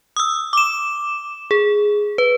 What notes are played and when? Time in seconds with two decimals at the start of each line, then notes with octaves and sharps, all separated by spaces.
0.16 D#6 E6
0.53 D6 E7
1.51 G#4
2.18 B4